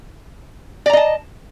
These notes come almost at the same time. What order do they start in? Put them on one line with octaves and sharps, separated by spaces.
D5 A#5 D#5 A5